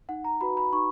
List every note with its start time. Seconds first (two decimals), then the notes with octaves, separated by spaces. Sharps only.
0.09 D#4 F#5
0.25 A#5
0.41 F#4 B4 B5
0.57 B5
0.73 D#4 C#6